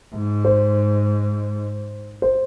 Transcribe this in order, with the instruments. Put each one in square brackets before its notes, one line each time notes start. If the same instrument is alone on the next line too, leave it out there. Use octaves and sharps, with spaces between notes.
[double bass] G#2
[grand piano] C5
C5